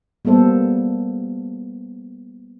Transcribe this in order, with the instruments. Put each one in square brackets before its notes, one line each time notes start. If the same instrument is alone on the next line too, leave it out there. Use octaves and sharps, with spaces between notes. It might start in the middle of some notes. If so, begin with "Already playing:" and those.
[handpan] G3 A#3 B3 A4 C5